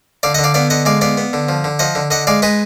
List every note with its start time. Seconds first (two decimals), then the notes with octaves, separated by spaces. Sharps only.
0.23 D3 D5 F5
0.34 D#5 F#5
0.39 D3
0.44 D5 F5
0.54 B3 D5 F5
0.70 D3 D#5 F#5
0.85 G#3 D5 F5
1.01 B3 D5 F5
1.17 B3
1.33 D3
1.49 F3
1.64 D3
1.79 F3 D#5 F#5
1.95 D3
2.11 D3 D#5 F#5
2.27 G#3 D5 F5
2.42 G#3 B4 D#5